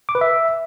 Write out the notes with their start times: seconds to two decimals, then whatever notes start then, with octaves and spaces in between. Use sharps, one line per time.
0.09 D6
0.15 B4
0.21 E5